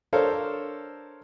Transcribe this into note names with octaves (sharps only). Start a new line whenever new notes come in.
D4 A4 A#4 C5 C#5 F5